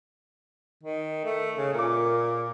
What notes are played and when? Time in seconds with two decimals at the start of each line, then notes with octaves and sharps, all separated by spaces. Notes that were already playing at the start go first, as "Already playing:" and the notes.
0.84 D#3
1.25 A3
1.57 C#3
1.74 A#2 A#4 D6